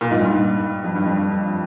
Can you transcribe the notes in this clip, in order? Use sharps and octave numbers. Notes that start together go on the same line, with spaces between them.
A#2
G#2
G2
F2
G2
F2
G2